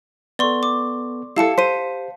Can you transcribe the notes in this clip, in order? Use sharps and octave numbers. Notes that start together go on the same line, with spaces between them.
B3 A4 D5 C6 C#6
D6
E4 G4 A4 F5 A5 C#7
C5 B6 D#7